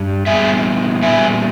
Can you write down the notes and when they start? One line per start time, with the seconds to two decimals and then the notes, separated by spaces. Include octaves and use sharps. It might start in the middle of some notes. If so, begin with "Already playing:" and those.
Already playing: G2
0.26 A#2 G3 B3 E5 G#5
1.02 A#2 G3 B3 E5 G#5